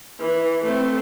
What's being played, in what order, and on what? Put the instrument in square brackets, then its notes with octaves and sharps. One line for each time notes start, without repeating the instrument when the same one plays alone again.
[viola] E3
A3 C4